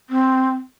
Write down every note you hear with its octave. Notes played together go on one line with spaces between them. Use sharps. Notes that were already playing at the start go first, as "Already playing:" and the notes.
C4